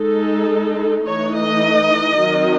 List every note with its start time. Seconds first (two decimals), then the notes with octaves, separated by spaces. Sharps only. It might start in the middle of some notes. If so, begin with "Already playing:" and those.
Already playing: G#3 D#4 A4
1.05 E3 A3 D#4 C#5
1.34 D#5
2.20 D#3 F#3 C4 D#4